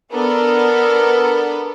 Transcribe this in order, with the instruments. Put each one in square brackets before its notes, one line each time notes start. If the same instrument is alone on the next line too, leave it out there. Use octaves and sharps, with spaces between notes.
[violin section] B3 D4 A4 [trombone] A#4